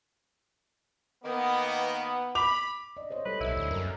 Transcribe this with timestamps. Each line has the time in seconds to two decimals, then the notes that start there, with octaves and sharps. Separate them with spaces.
1.24 D#3 A#3 B3
2.35 B5 D6 F7
2.97 D5 D#5
3.10 C5 C#5 D#5
3.26 G3 A4 B4 C#5
3.41 B1 E4
3.57 D2
3.71 F#2 A#4